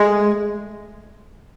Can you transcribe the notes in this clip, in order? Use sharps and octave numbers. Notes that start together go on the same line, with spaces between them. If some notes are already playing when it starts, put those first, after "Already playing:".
Already playing: G#3